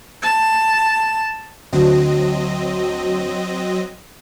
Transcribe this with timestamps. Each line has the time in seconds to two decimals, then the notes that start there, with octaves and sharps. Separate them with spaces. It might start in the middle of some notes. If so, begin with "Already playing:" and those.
0.22 A5
1.73 D2 F#3 C4 D#5